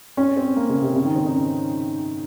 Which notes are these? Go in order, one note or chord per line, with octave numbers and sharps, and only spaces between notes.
C#4
C4
A#3
C#3
C3
C#3
D#3
C4
D#4
C#4